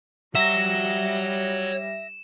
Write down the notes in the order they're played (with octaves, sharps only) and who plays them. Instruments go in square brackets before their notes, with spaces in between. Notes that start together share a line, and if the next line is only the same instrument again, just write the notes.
[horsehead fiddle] G3 [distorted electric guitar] C#5 F#5 [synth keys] E5 A#6 [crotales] E7